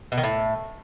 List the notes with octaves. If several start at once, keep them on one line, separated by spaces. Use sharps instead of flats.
B2
D#3
A2